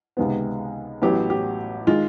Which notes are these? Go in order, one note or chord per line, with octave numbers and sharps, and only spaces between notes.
C#2 C3 D#3 G#3 B3
A1 A2 F#3 B3 G4
G4
D#3 G#3 F4